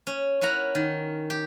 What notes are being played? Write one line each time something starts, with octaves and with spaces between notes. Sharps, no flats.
C#4
C#4 E4 A#4 F#5 A#5
D#3
G4